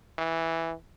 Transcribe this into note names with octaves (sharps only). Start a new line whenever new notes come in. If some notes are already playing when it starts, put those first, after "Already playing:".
E3